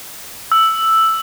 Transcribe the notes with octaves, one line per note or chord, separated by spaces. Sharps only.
E6